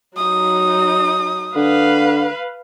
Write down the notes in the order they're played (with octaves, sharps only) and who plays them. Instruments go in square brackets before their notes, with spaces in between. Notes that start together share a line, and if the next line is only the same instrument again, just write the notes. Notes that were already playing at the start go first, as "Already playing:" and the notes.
[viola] F#3 D#4 [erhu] D#6
[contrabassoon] D3 [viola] B4 F5